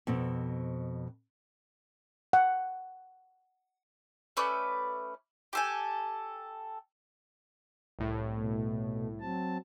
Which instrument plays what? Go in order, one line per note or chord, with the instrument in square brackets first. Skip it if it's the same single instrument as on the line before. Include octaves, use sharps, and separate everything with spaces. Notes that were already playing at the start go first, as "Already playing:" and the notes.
[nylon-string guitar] F2 B2 C4
[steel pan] F#5
[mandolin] A3 C#4 B4 D5
G4 A4 G#5
[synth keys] C2 A2
[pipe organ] B2 A3
F#3 C4 A5